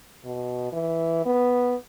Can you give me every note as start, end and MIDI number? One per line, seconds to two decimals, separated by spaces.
0.25 0.67 47
0.72 1.25 52
1.25 1.76 59